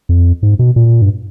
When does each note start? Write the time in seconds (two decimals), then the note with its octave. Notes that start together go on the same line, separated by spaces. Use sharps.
0.09 F2
0.43 G#2
0.59 B2
0.76 A#2
1.02 G2